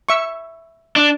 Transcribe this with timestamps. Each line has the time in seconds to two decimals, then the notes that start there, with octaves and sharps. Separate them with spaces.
0.09 E5 C#6
0.96 D4